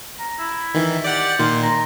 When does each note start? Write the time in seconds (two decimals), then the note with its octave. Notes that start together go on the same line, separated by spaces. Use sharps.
0.19 A#5
0.39 E4
0.74 D#3 E3
1.05 G4 D5 F#5 A6
1.39 A#2 D#3 C6
1.63 A#5